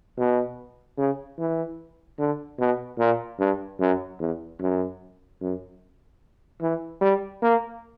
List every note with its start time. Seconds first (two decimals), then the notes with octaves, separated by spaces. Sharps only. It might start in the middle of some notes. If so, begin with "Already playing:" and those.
0.18 B2
0.98 C#3
1.38 E3
2.19 D3
2.59 B2
2.99 A#2
3.39 G2
3.80 F#2
4.19 E2
4.60 F#2
5.41 F#2
6.61 E3
7.01 G3
7.42 A#3